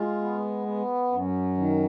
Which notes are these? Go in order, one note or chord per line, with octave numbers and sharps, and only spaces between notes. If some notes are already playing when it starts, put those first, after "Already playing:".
Already playing: G#3 F4
B3
B3
F#2
D#3